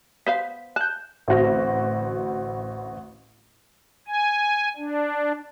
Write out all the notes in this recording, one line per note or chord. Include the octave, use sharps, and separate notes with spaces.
B3 C5 F5 B6
A5 F#6 G6
A1 D2 C4 F#4 A#6
G#5
D4